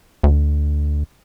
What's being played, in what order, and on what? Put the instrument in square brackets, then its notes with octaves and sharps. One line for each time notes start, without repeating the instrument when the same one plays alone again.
[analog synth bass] D2